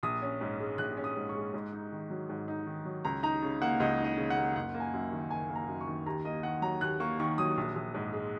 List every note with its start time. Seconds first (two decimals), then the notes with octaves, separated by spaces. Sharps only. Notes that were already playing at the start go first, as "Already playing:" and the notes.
0.03 A#1 D#6
0.22 C#4
0.41 G#2
0.60 G#3
0.78 A#1 F#6
0.97 C#4
1.04 D#6
1.17 G#2
1.29 C#6
1.35 G#3
1.54 G#2
1.73 D#4
1.92 D#3
2.10 F#3
2.29 G#2
2.48 D#4
2.67 D#3
2.85 F#3
3.05 C#2 A#5
3.23 D#4 A#5
3.42 C#3
3.62 A#3 F#5
3.80 C#2 D#5
3.99 D#4
4.04 D#5
4.17 C#3
4.30 F#5
4.37 A#3
4.55 F#1 F#5
4.74 A#3
4.80 G#5
4.93 F#2
5.12 D#3
5.30 F#1 G#5
5.50 A#3
5.55 A#5
5.68 F#2
5.81 C#6
5.87 D#3
6.06 D#2 A#5
6.25 A#3 D#5
6.43 D#3 F#5
6.62 F#3 A#5
6.81 D#2 F#6
7.00 A#3 C#6
7.19 D#3 C#6
7.38 F#3 D#6
7.57 A#1
7.76 A#1
7.94 G#2
8.13 G#3